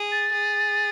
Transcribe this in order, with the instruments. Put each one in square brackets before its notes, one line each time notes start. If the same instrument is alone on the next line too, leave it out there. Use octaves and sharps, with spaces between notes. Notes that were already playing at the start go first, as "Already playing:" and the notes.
Already playing: [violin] G#4
[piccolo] A6
[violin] G#4